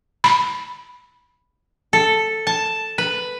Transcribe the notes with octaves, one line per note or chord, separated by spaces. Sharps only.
B5
A4
A5
B4